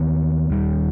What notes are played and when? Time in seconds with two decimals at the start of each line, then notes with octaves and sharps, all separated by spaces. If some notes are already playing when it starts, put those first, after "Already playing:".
Already playing: D#2 D#3 B3
0.50 D#2 D#3 G3